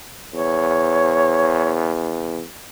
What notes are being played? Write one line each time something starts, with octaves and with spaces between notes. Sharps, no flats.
E2 C#5